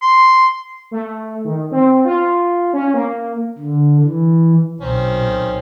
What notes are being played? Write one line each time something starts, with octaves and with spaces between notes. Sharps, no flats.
C6
A3
D#3
C4
F4
C#4
A#3
D3
E3
B1 B2 D#3 C4 C#4